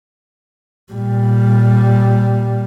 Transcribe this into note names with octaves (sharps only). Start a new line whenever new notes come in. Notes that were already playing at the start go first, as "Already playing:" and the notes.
A#2 G3